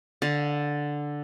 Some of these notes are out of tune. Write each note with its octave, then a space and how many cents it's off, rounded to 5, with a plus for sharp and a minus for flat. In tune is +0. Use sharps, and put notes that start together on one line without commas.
D3 +0 F5 +20